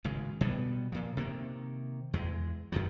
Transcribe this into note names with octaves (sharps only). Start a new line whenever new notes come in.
G#1 C#3 G#3
B2 G3 B3
A#2 F3
C3 D#3 A#3
E2 G#3
F#2 D#3 F3 F#3